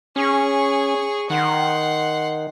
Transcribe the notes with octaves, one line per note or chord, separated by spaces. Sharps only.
C#4 G#4 C#6
D#3 F#5 C6